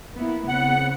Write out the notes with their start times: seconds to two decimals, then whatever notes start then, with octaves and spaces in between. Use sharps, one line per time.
0.18 A#3 B3 E4
0.48 C#3 B3 C4 F#5